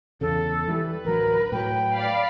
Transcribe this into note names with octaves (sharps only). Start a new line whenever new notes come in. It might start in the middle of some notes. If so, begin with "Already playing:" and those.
E2 C#3 A4
E3 G3 B4
A1 D2 F#3 A#4
A2 F#3 G5
D5 F5 B5